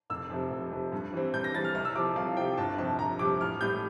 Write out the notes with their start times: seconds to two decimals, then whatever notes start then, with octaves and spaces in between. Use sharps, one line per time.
0.10 F1 E6
0.30 F2 C3
0.51 F1
0.71 F2 C3
0.92 G2
1.13 E3 G3 C4
1.33 G2 G6
1.44 A#6
1.54 E3 G3 C4 A6
1.64 F6
1.75 C2 F6
1.85 E6
1.95 C3 F3 D6
2.16 C2 F5
2.37 C3 F3 G5
2.57 G1 A5
2.78 F2 C3 G3 A5
2.99 G1 A#5
3.19 F2 C3 G3 D6
3.40 A1 F6
3.61 A2 G3 G6